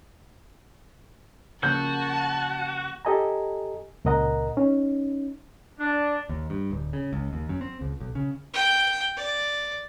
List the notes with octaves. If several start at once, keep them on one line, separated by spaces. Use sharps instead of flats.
C#3 F3 A#3 F#4 A5 G6
G4 A4 D#5 G#5 A#5
C#2 A#2 A#4 D#5 F#5 A#5
C#4 D#4
D4
D#2
G2
D1
C#3
C#2
D#2
F#2
C4
C#2
B1
C#3
G5
D5